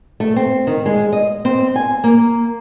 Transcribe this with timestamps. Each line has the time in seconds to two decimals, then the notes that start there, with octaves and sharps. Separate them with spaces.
0.20 A3
0.36 C4
0.67 D#3
0.86 G#3
1.12 D#5
1.45 C4
1.76 G#5
2.04 A#3